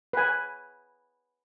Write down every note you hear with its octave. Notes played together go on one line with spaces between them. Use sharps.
B4 G#5